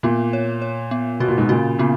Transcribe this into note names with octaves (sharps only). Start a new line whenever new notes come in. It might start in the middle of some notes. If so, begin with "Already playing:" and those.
A#2 B3
C#5
C#5
B3
B2 F#4
A#2
G#2 B2
A#2 C#3 F#4
A#2 C#3 B3